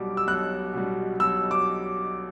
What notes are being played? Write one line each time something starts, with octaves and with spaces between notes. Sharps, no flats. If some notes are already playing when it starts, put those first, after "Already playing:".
Already playing: B1 B2 G3 D6
E6
B1 F#6
B2 G3
B1 E6
D6